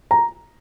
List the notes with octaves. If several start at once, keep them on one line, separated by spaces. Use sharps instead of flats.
A#5